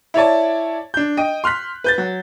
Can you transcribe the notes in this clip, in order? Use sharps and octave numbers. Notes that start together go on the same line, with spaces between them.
E4 C#5 D5 A5
D4 G6
D#5 G5
C6 F6 F#6 B6
B4 G6 A6
F#3